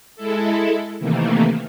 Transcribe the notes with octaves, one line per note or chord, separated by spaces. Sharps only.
G#3 E4 A4
C3 D#3 E3 A3 A#3